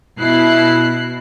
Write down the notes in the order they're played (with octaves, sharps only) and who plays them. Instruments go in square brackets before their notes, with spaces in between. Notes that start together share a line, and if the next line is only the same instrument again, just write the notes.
[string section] B2 E4 F#6 C7